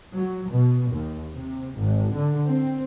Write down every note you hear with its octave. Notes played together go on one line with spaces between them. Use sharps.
F#3
B2
D#2
C3
G#1
D3
C4